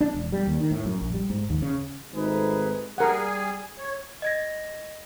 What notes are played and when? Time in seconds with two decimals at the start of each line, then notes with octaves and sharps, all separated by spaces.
0.01 D4
0.14 E1
0.32 G3
0.47 D#2
0.59 D#3
0.71 A2
0.85 F#2
1.01 A#1
1.13 G3
1.30 G#2
1.50 D#2
1.62 C#3
2.13 G#1 A3 C4 D#4 G#4 B4
2.98 G3 G#4 A#4 F#5 G#5
3.79 C#5
4.22 D#5 G#6 A#6